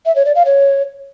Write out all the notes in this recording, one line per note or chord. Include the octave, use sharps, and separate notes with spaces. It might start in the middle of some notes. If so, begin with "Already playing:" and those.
E5
C#5
D5
F5
C#5